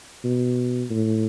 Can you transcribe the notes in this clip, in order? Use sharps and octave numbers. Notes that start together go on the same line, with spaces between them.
B2
A2